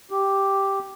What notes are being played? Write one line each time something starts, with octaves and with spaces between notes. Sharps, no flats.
G4